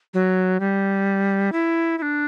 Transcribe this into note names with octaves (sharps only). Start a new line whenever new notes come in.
F#3
G3
E4
E4
D4